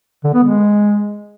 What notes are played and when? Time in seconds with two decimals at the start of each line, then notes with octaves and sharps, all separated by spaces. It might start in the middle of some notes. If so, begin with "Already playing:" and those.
0.24 D3
0.34 B3
0.43 G#3